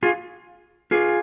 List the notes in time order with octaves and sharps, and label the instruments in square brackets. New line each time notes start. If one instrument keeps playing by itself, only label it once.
[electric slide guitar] F4 G#4
F4 G#4